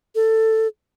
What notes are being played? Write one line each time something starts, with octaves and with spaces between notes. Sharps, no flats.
A4